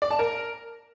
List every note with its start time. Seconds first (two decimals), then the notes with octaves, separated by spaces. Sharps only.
0.02 D5
0.10 A5
0.19 A#4